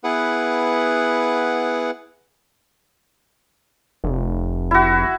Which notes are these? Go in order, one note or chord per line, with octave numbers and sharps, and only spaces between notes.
B3 E4 G#4 B4 F#5
F1
E4 F#4